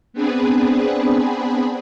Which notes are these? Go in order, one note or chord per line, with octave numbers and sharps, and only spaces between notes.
B3 C4 D4 G#4 B4